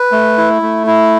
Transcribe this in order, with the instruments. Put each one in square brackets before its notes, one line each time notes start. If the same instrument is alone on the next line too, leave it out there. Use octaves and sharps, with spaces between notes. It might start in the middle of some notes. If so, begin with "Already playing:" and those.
Already playing: [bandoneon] B4
A3
E4
A3
E4